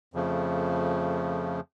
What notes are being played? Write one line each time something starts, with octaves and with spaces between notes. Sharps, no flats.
F2 C#3 F3 A3